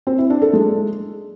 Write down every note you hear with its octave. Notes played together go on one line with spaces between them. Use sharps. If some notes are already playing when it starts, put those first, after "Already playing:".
C4
E4
D4
A4
G#3